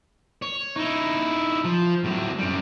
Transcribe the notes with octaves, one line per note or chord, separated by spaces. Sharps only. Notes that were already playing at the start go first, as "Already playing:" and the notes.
C#5
D#4 E4
F3
A2 F#3
F#2 G3